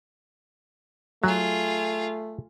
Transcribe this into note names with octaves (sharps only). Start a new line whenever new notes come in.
F#3 A3 F4 G#4